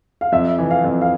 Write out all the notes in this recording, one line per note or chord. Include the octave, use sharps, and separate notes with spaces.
F5
F2 E5
E3
F5
F2
F5